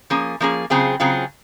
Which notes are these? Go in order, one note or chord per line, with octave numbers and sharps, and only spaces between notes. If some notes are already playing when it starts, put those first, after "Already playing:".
F3 A#3 C#4 G#4
F3 A#3 C#4 G#4
C#3 F#3 C4 F4 G#4
C#3 F#3 C4 F4 G#4